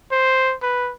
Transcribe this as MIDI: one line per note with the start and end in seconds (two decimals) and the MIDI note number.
0.12 0.55 72
0.62 0.93 71